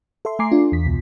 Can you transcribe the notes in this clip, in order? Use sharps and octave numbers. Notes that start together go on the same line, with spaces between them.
A4 E5 C6
A3 G#5 A#5 D6 C7
D4 F4
E2 B6
C#2 B2